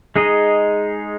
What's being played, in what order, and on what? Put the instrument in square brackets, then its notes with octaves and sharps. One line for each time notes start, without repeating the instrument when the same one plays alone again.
[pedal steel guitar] G#3 D#4 G#4 D#5